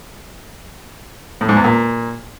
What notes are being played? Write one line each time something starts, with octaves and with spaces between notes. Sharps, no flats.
A2
G#2
E2
A#2